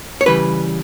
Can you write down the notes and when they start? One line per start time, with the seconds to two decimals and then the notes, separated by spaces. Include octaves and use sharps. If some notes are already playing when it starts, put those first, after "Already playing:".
0.21 C#5
0.26 C#3 E3 G3 B4